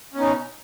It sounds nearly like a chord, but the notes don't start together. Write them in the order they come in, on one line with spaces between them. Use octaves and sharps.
C#4 B3 D#4 B2